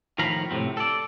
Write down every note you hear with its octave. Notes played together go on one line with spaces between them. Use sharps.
A2 D#3 F3 F5 A#5 B5
A2 C3 F#3 C4
A4 D5